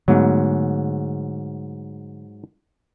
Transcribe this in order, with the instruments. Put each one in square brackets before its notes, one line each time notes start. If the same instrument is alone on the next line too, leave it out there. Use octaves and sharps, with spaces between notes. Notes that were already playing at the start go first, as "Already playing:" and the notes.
[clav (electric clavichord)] G#2 F#3 [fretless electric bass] D3 A3 B3